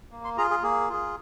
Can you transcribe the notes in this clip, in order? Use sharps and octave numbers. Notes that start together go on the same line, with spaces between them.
A#3
C6
F4 G#4 A#5
G#4
A#3 G#4
F4 G#4